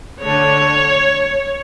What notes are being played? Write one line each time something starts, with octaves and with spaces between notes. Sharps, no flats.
D3 A3 D4 C#5